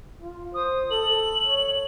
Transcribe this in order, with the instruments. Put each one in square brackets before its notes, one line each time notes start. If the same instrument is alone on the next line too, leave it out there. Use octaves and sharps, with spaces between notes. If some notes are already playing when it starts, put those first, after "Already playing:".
[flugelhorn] F4
[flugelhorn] C5 [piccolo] D#6
[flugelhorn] A4 [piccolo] F#7
[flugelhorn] C#5